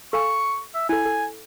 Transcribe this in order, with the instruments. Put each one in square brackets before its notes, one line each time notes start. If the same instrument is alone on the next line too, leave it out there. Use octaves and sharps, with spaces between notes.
[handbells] A4 F5 G#5 [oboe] C#6
[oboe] E5
[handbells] E4 A4 [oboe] G#5
[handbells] A4